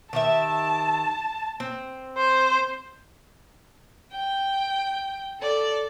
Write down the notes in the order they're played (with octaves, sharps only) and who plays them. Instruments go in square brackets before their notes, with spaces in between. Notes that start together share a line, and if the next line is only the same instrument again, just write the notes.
[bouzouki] D#3 G4 E5 [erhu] A5
[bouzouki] C4
[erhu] C5
[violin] G5
A4 D5